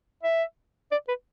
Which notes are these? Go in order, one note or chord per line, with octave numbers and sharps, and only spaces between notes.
E5
D5
B4